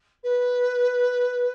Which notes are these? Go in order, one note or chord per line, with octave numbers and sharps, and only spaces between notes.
B4